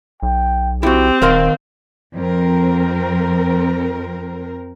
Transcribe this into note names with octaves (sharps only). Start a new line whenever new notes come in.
B1 G5
C4 E4 F#4 G4
D#1 D#3 A#4 F5 C6
F2 C4 A#4